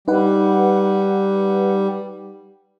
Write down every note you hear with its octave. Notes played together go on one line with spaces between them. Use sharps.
G3 D#4 B4 F#5